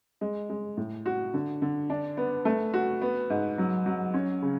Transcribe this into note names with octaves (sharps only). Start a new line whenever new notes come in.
G#3
G#3
A2
F#4
D3
D3
D4
B3
A3
F#4
B3
G#2
F#3
F#3
C#4
C#3